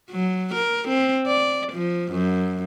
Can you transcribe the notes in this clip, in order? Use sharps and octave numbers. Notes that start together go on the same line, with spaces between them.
F#3
A#4
C4
D5
F3
F#2